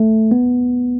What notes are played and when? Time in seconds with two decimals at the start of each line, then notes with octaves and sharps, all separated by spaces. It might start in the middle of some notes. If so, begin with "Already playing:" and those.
Already playing: A3
0.31 B3